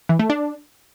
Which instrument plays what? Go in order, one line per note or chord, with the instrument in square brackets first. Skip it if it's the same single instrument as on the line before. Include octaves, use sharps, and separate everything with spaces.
[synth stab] E3
A3
D4